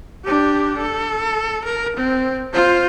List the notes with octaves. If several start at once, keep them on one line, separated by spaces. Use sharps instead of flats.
D4 G4
A4
A#4
C4
F4 C5